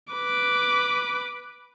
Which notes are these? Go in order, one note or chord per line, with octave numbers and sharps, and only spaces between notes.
B4 D6